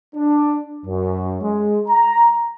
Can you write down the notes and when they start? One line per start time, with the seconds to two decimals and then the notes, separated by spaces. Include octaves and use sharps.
0.15 D4
0.85 F#2
1.41 G#3
1.88 A#5